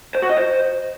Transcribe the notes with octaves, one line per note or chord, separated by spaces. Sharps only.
C5
F#4
D#5
C5